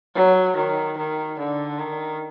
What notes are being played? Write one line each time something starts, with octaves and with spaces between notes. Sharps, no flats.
F#3
D#3
D#3
D3
D#3